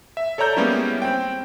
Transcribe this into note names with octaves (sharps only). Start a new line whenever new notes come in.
E5
A4 C#5 D5 A#5 G6
G3 G#3 A#3 B3 C#4 E4
C4 G5